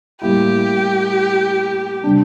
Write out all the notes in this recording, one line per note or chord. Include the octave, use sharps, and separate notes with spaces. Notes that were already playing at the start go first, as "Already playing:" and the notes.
A2 G3 A#3 E4 G4
C3 G3 D4